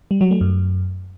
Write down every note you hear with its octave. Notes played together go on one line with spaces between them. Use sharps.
G3
F#3
A3
F#2